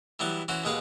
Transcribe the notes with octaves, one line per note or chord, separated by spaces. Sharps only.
E3 F#3 G3 B3 E4
E3 C#4 F#4 C5
D#2 B2 G#3 G#4 B4 F5